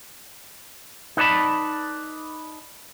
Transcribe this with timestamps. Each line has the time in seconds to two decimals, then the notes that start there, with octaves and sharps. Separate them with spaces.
1.17 D#4 B4 D5 A5 B5